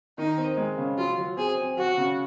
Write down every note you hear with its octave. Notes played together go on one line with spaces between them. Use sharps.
D#3 D#4
C4
G#3
C#3
F#3 F4
F#3
C4 G#4
C4
F#3 F#4
C#3